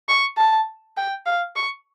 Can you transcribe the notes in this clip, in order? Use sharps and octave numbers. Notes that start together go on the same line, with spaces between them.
C#6
A5
G5
F5
C#6